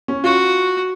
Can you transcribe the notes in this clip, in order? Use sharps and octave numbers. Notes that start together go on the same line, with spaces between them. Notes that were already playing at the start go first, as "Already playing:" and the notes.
C#4
F4 F#4